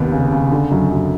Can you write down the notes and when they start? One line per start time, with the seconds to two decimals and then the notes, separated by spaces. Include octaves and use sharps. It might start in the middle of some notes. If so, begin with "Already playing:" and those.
Already playing: F1 D#2 B3
0.12 C#3
0.32 C#3
0.52 D3
0.71 F#2
0.90 F#2